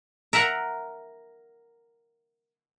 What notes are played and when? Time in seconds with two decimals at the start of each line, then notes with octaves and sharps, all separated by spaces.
0.33 A#4 E5 F#5 A#5